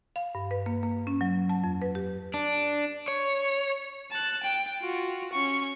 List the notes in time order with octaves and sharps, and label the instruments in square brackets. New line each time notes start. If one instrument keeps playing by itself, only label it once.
[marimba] F5
G2
B4
A#3
A#3
C#4
F#3
A5
F2
B4
G4
[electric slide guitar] D4
C#5
[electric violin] A5 F#6
G5
F4 F#4
C#4 C#6